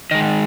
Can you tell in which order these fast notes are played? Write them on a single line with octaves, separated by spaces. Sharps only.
D#3 D#5 G#3